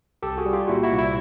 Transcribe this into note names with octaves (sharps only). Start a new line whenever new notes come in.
C2 G4 A4
F#4 G#4
G3
F4 G4
A#2 E4 F#4
E4 F#4
C2
E4